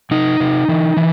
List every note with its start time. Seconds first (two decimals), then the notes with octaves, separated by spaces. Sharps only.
0.11 C3 D#4
0.40 C3
0.68 E3
0.97 E3